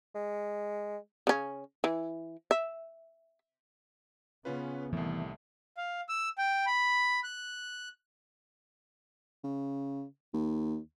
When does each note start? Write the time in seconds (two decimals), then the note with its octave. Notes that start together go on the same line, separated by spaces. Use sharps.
0.15 G#3
1.27 C#3 C#4
1.84 E3
2.51 E5
4.45 C#3 B3 C#4 F4 B4
4.93 C2 A2 D#3 E3 A3 B3
5.77 F5
6.09 E6
6.38 G5
6.67 B5
7.24 F#6
9.44 C#3
10.33 D#2